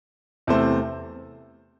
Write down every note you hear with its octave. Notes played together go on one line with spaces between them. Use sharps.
E2 C3 A3 E4 C5